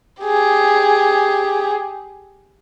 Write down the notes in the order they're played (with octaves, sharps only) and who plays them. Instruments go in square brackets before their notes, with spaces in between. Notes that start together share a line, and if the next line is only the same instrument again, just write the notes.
[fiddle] G4 G#4